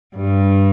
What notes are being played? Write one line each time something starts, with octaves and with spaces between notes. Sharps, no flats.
G2